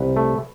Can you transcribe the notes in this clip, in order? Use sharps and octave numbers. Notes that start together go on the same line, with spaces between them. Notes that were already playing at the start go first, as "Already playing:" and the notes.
Already playing: C2 B4
A3